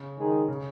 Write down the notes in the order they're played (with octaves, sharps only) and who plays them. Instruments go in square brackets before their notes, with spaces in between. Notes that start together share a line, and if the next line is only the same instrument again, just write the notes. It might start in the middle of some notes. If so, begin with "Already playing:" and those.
Already playing: [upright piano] C#3
[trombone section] D#3 G#3 D#4 G#4
[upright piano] C#3